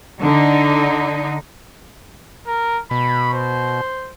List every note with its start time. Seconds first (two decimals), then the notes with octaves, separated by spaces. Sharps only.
0.22 D3 D#4
2.47 A#4
2.91 B2 B5
3.34 C5